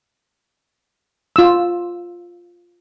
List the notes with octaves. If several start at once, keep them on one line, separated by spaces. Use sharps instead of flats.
F4 E6